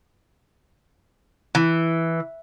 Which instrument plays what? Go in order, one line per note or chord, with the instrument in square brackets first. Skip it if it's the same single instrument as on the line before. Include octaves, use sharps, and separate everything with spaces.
[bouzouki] E3